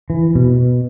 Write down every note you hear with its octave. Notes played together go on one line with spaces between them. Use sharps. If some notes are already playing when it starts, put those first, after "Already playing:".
E3
B2